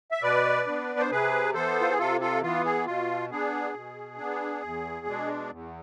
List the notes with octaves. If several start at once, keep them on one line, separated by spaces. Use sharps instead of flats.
E5
B2 B4 D5
B3 D4
C5
C3 G#4 B4
E3 B3 A4 C5
F4
G#4
C3 F4 A4
F4 A4
E3 B3 F4
G#4
B2 F4
B3 D4 G#4
B2
B3 D4
E2
B2 G#3 D4
E2